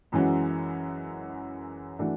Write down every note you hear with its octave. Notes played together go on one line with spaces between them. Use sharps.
F#2 E3 G#3 C#4 F#4
E3 A3 D4 F#4